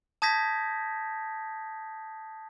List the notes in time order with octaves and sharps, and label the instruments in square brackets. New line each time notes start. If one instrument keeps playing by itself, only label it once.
[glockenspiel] A5 D#6 G6 G#6 A#6 B6